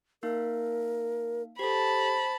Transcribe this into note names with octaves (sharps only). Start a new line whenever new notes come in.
A#3 D#4 A#4 F5
G4 A4 C5 A5 B5